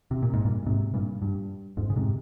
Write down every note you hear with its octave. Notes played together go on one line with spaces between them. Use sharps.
C3
A#2
G#2
G2 A#2
G#2 C3
G2 A#2
G2
F2 G#2
C#3
G#2 C3